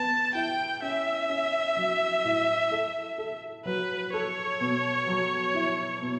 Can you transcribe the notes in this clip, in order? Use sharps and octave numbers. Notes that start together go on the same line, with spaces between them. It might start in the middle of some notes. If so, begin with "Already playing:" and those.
Already playing: B3 A5
E4 G5
C#4 E5
C#4
F#3
A2
A4
A4
F#3 B4
A4 C#5
B2
F#3
E4
B2